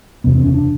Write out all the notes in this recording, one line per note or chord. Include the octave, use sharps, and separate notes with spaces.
F#1 E2 C3 B3
C4
C#4
D4